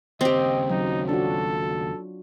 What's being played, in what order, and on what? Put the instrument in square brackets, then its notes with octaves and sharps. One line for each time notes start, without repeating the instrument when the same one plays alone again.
[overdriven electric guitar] D#2 C#3 [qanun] C4 G4 [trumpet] D#5
[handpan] F#3 [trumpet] D#4
[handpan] D4 F4 F#4 [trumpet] A4